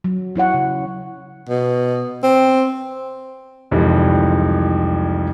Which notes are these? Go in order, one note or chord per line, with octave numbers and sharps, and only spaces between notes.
F#3
F#3 E4 C#5 F#5
C#3
B2
C4
C2 F2 D#3 E3 G3 G#3